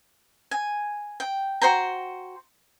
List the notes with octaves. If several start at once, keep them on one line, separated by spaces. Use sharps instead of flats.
G#5
G5
F#4 C5 G5 A#5